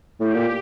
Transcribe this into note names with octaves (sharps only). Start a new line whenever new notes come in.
A2 G4
A#2